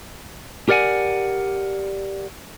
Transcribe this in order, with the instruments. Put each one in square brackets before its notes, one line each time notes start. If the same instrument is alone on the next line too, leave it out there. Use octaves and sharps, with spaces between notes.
[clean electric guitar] G4 A#4 D5 F#5 G#5